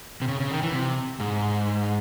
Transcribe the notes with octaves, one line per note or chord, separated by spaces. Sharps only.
C3
C#3
C#3
D#3
E3
C3
G#2